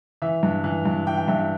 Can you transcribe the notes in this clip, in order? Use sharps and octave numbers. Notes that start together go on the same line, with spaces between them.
E3 E5
G2
E3
G2
E3 G5
G5
G2 E5
E5